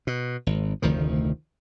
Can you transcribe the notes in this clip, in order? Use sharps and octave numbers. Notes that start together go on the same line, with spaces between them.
B2
G#1
F1 D2 D#3 F3